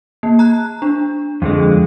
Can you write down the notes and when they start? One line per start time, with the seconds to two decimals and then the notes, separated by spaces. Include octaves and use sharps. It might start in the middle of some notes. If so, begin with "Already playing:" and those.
0.23 A#3
0.39 A#5 F#6
0.82 D4
1.42 F2 D3 G#3